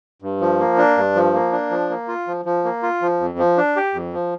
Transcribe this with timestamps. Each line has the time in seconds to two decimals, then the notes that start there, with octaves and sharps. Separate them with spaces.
0.22 G2
0.41 F3
0.60 A#3
0.78 D4
0.97 G2
1.15 F3
1.34 A#3
1.52 D4
1.71 F3
1.90 A#3
2.08 F4
2.27 F3
2.45 F3
2.64 A#3
2.83 F4
3.02 F3
3.20 F2
3.39 F3
3.57 D4
3.76 G4
3.94 F2
4.13 F3